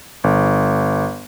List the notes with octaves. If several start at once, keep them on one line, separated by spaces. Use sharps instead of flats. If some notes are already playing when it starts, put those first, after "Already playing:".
G1